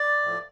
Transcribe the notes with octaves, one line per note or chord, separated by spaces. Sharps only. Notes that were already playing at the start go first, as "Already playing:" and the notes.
Already playing: D5
A2 F3